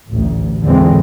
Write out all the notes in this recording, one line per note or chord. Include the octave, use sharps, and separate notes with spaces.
A1 D2
E2 A#2 D3 E3 G#3 C4